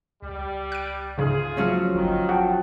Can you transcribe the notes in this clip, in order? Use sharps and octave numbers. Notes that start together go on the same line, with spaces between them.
C#2 G3
F#6 D7
G#2 C#3 A3 F4 G#4
F3 F#3 C#4
G1 D#3
F#4 F#5 G5 A5